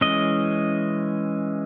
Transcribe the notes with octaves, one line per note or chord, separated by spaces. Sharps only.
E3 G#3 C#4 D#5